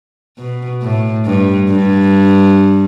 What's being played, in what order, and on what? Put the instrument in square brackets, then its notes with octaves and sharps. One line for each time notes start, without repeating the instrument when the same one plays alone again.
[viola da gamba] B2
A2
G2
G2